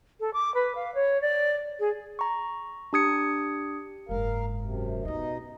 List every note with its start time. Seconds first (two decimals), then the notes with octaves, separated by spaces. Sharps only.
0.20 A4
0.33 D6
0.54 B4
0.75 F5
0.94 C#5
1.21 D5
1.79 G#4
2.19 A#5 C#6
2.93 D4 G4 D#6 G#6 C#7
4.09 F#1 G#2 A#4 F5
4.61 F#2 C3
5.05 B2 B3 C#4 D#4 D#5